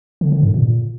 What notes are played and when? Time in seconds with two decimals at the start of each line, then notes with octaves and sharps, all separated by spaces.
0.21 D3
0.32 D3
0.43 G2
0.54 A#2